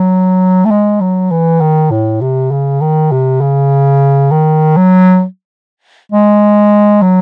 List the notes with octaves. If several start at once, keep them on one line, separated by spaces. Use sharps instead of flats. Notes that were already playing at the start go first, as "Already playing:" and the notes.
Already playing: F#3
A3
G#3
F#3
E3
D#3
A2
C3
C#3
D#3
C3
C#3
D#3
F#3
G#3
F#3